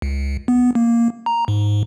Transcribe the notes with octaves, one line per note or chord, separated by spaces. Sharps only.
C#2
B3
A#3
A#5
G#2